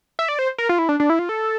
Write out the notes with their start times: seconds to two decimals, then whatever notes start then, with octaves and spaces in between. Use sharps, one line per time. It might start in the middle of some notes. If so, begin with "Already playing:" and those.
0.19 E5
0.29 D5
0.39 C5
0.58 A#4
0.69 F4
0.79 E4
0.89 D4
1.00 D4
1.10 E4
1.19 F4
1.29 A4